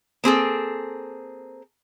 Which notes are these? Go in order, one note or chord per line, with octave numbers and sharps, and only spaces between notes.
A#3 C4 G#4 A4